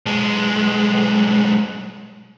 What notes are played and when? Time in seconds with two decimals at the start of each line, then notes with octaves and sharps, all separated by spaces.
0.06 B1 G#3